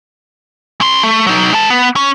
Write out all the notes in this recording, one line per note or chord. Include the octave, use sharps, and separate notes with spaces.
C#4 C6
A3
F#3 D#4
G#3 A5
B3
C#4